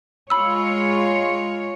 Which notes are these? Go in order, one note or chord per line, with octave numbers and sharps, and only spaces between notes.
G#3 F4 C#5 B5 E6